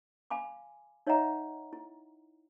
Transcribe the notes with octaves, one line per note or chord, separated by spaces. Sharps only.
F5 G#5 B5 D6
D#4 C#5 D#5 E5 F#5 A#5
E4